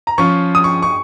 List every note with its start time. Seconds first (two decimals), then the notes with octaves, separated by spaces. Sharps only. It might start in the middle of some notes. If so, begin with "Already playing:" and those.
0.07 A#5
0.18 F3 C#4 F4 C#6
0.55 D#6
0.64 C#6
0.82 C#6